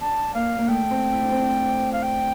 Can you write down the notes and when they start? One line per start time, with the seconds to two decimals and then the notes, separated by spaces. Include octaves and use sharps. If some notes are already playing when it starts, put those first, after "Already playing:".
0.01 D4 A5
0.34 A#3 F5
0.59 A#3
0.68 A3 G5
0.91 C4
1.12 E4
1.22 D4
1.32 C4
1.41 D4
1.92 F5
2.02 G5